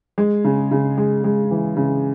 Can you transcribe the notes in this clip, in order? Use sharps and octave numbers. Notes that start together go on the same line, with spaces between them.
G#3
C#3
C#3
G#3
G#3
E3
C#3